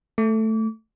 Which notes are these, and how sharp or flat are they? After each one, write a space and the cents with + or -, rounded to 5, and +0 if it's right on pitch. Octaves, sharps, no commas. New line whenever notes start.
A3 +5 D6 -35